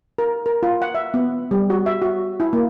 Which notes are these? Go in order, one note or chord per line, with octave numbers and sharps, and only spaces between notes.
A#4
A#4
F4
F#5
E5
B3
G3
F#4
E5
F#4
E4
A#3